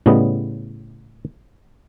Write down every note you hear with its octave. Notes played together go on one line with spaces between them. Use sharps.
A2 C#3 G3 B3 D#5